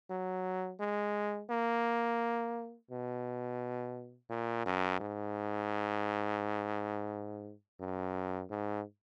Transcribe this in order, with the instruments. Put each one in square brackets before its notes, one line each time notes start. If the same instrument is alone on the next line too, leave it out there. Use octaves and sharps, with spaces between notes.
[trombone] F#3
G#3
A#3
B2
A#2
F#2
G#2
F#2
G#2